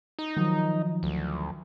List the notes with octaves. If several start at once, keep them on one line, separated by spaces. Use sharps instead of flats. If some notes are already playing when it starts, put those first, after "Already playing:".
D#4
D#3 F3 F#3
D2